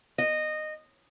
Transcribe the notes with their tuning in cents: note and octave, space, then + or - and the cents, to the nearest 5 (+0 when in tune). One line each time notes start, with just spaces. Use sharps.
D#5 -15